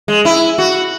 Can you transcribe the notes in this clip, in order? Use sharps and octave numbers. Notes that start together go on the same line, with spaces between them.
G#3
E4
F#4